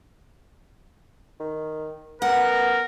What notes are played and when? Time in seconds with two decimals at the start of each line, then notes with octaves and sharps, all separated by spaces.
1.40 D#3
2.22 B3 A#4 F#5